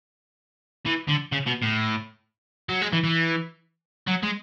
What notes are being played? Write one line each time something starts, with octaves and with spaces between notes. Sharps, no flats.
E3
D3
C#3
B2
A2
F#3
G#3
E3
E3
F#3
G#3